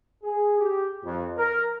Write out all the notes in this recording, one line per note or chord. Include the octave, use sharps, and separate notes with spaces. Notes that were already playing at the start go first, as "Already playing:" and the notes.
G#4
G4
F2
A#4